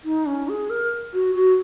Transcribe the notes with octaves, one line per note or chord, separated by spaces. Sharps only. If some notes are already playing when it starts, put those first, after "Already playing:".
D#4
C#4
G#4
A#4
F#4
F#4